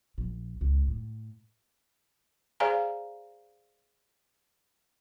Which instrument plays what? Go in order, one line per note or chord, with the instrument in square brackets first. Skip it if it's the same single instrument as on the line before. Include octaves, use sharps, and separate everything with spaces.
[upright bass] A#1
C#2
A2
[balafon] G#4 C5 D5 F5 G#5 A#5